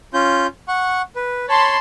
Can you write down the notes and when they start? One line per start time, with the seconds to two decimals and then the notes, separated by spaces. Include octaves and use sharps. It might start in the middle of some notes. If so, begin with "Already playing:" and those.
0.14 C#4 F4 G6
0.68 F#5 C#6
1.16 B4
1.48 C#5 A5 B5 C6